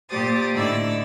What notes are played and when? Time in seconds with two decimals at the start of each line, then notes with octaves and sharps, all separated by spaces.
0.10 A#2 G4 C5 D5 D#6 A6
0.53 A2 D3 D#4 E4 D5 E6